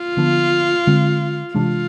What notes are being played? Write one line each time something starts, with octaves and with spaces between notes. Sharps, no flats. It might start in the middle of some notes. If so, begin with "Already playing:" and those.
Already playing: F4
D3 F3 B3 D4
D3 G#3 C4
C3 E3 G#3 D4 F4